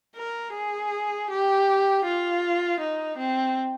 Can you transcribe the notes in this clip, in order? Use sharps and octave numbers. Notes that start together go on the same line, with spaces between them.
A#4
G#4
G4
F4
D#4
C4